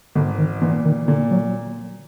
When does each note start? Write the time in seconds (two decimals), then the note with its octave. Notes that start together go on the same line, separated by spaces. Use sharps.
0.15 G#1 D3
0.38 D#3
0.61 A#2 E3
0.85 D#3
1.08 A#2 D3
1.31 F#3